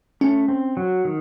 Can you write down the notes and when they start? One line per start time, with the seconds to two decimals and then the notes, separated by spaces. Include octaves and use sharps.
0.21 A3 C#4
0.48 C4
0.77 F#3
1.05 D#3